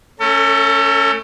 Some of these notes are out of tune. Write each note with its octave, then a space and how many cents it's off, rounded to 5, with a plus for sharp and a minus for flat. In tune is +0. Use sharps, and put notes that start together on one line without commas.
A3 +0 C#4 +0 A4 +40